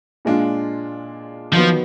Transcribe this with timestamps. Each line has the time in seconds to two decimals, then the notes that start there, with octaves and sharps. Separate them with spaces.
0.25 A#2 G#3 D4 F4
1.53 D#3 F3 F#3 B3